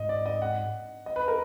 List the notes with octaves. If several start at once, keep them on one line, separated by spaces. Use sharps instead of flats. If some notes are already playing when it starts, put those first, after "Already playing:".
Already playing: G#2 D#5
D5
D#5
F#5
D#5
B4
A#4